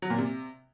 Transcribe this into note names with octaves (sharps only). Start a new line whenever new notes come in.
F#3
A#2
C3